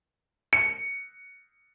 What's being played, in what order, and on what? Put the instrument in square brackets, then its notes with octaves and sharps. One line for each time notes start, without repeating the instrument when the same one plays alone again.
[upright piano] C#7